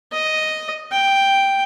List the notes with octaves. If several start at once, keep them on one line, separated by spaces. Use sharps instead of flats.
D#5
G5